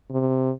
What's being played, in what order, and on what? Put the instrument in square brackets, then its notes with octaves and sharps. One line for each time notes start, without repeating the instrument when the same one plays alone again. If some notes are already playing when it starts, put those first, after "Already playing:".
[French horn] C3